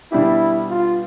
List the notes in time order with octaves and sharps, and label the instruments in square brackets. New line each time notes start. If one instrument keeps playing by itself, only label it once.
[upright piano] B2 G3 D4 G4 [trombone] E4
[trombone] F4